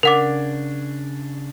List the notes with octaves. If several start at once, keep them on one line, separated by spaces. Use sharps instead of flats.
C#3 D4 A#4 F#5 D6